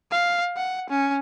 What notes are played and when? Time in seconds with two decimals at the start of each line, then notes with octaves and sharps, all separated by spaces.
0.12 F5
0.57 F#5
0.90 C#4